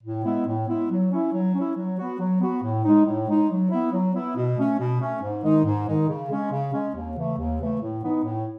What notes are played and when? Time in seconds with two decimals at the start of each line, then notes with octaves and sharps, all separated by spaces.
0.03 A2
0.25 G#3 B3 E4
0.47 A2
0.68 G#3 B3 E4
0.90 F#3
1.12 C#4 E4
1.33 F#3
1.54 C#4 E4
1.76 F#3
1.99 B3 F#4
2.20 F#3
2.41 B3 F#4
2.63 A2
2.85 G#3 D#4
3.06 A2
3.27 G#3 D#4
3.50 F#3
3.70 B3 E4
3.93 F#3
4.14 B3 E4
4.36 B2
4.58 A3 C#4
4.79 B2
5.00 A3 C#4
5.22 G#2
5.43 D#3 G#3 D#4
5.65 G#2
5.87 D#3 G#3 D#4
6.09 C#3
6.30 G#3 C#4
6.52 C#3
6.73 G#3 C#4
6.95 D#2
7.17 C#3 E3 A3
7.38 D#2
7.60 C#3 E3 A3
7.81 A2
8.03 E3 B3 D#4
8.24 A2